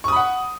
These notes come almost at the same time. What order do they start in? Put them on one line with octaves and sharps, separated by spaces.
C#6 D#6 B5 F#5